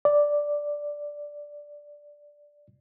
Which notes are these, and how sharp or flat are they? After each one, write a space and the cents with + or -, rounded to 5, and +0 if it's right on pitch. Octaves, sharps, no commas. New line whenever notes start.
D5 +0